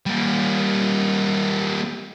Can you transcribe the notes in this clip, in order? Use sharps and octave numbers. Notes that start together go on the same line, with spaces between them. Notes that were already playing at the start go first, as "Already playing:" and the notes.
G3 A#3